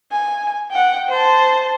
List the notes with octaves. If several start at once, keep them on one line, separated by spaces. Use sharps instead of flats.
G#5
F#5 G5
C5 A5